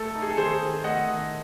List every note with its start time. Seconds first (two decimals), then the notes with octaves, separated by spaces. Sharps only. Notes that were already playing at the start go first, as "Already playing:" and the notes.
Already playing: A3 A4
0.15 D#4
0.22 G#4
0.30 A4
0.37 D#3 G#4 C5
0.61 D#3
0.84 A3 D#5 F#5
1.08 D#3